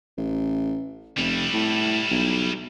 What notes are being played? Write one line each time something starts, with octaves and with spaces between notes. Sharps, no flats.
A1
F1 G3 E4
A2
B1